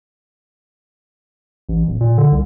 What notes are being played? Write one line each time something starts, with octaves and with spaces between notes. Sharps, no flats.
A1
D1
A#2
D3
C2